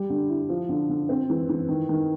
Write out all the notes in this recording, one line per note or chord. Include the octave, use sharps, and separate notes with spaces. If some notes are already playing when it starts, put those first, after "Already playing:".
Already playing: G3
D3
E4
F3
D3
D3
C4
E3
E3
D#3
D#3